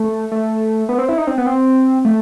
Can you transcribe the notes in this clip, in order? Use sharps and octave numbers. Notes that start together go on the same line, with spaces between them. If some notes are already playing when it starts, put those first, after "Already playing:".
Already playing: A3
A3
B3
C4
E4
D#4
C4
B3
C4
A3